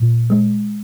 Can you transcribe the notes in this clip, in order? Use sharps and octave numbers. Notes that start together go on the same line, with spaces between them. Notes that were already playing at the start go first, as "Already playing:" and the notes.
Already playing: A#2
G#3